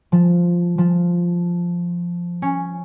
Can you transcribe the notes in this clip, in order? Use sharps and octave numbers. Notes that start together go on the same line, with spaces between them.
F3
F3
C#4